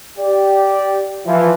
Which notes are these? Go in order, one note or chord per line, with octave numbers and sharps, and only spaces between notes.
G4 D5
E3 F3